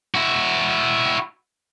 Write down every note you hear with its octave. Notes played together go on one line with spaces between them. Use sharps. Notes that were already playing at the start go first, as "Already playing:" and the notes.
E4 F#4